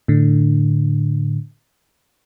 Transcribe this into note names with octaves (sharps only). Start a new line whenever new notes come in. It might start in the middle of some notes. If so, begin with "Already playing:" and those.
A2 D3